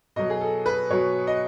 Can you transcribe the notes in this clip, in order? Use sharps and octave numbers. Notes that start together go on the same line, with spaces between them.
B2 F#3 D#5
G#4
A4
B4
B2 F#3 C#5
D#5